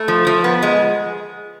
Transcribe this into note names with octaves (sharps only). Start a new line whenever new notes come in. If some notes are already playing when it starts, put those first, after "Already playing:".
Already playing: A3
F3
F3
B3
G#3